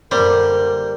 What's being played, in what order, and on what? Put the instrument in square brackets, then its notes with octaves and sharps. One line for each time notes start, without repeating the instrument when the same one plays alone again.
[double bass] F#2 D3 [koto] G3 [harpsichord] A#3 C5 [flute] A#4